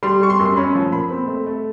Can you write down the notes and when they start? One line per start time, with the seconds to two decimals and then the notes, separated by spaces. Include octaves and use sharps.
0.03 G3 C6
0.22 G3 C#6
0.30 C6
0.39 F#2
0.46 C6
0.56 C#4 B5
0.75 F3
0.92 A#2 B5
1.10 C4
1.27 A3
1.46 A3